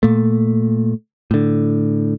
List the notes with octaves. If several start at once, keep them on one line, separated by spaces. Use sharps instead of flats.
A#2 A3
A2 D3